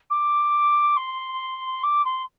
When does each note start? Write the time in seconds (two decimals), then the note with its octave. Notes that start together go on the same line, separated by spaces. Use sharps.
0.10 D6
0.97 C6
1.83 D6
2.05 C6